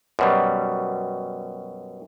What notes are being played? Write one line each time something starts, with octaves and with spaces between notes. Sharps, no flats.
F#2 B2 G3